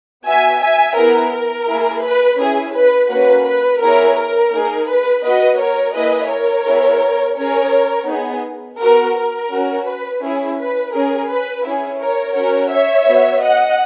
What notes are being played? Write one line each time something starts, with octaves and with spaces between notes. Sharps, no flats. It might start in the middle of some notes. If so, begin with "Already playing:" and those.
B3 F#4 E5 G#5
E5 G#5
B3 E4 G#4 A#4
A#4
A#3 E4 G#4
B4
C#4 E4 G#4
B4
A#3 C#4 F#4 B4
B4
B3 E4 G#4 A#4 C#5
A#4
A#3 D#4 G#4
B4
B3 F#4 B4 D#5
A#4 C#5
A#3 E4 G#4 B4 D#5
A#4 C#5
B3 E4 G#4
C#4 G#4 A#4 C#5
B3 D#4 G#4
B3 F#4 A#4
A#4
C#4 F#4
B4
C#4 E4 G#4
B4
C#4 G#4 A#4
B4
C#4 E4 G#4
A#4 C#5
C#4 F#4 A#4 C#5
C#5 E5
B3 F#4
D#5 F#5